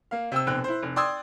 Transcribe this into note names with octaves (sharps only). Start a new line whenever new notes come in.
A#3 F5
C3 G5 E6
F1 B2 C4 G5 F#6
E4 C5
F1
D5 G5 C6 D#6 E6 G#6